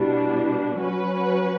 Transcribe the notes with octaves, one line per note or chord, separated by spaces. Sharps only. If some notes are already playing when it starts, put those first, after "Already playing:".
Already playing: B2 G3 D4 E4 G4
F#3 C#4 F#4 B4